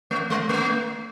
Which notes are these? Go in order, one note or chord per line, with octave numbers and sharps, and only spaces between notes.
A3
G#3
A3